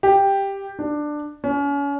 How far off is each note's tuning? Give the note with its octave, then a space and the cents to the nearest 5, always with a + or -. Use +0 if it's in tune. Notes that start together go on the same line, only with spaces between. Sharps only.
G4 +5
D4 +15
C#4 +35